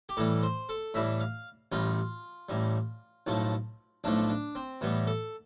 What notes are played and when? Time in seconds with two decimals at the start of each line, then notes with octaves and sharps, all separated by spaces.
0.09 G4
0.17 A2 E3 G3 A4
0.43 C5
0.69 A4
0.94 A2 E3 G3 E5
1.20 F5
1.72 A1 A2 G3 F4
2.49 A1 A2 G3
3.27 B1 A2 F3 A3
4.04 B1 A2 F3 A3 D4
4.29 D4
4.55 C4
4.81 A2 E3 G3 B3
5.07 A4